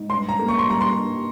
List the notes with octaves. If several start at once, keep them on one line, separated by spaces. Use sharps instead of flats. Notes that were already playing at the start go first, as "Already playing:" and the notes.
Already playing: G#2
G2 C6
A#5
A#3
C#6
C6
G3 A#5
C6
G2